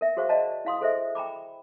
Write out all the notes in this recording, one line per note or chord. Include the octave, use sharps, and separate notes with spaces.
A#4 E5
F#4 G#4 C5 F5 C#6
D5 D#5 F5 A5 A#5
E4 F5 C6 D#6
G#4 A4 C5 D#5 E5
G5 A#5 B5 D6